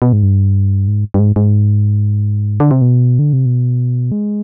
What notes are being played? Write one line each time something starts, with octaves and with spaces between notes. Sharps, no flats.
B2
G#2
G2
G#2
G2
G#2
G#2
D3
C3
B2
D3
C3
B2
G#3